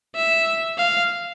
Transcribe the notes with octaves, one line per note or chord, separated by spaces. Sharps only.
E5
F5